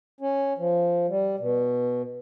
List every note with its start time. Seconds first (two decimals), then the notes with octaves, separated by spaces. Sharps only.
0.21 C#4
0.58 F3
1.09 G3
1.39 B2